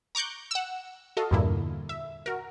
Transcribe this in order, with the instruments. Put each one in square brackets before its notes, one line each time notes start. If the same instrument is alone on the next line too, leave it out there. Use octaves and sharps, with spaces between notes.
[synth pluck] A#5 C#6 D6 F#6 G6
F#5 E6
F#4 A4 D#5 F5
E2 G2 A#2 D3 A#3 E4
E5
F#4 A#4